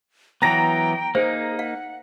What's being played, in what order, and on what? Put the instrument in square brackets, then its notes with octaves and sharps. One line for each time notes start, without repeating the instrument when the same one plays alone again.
[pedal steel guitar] E3 F#3 B3 [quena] G5 [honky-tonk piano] A#5 A#6
[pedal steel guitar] A#3 D#4 [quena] G#4 [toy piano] C5
[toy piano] F5 [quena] F#5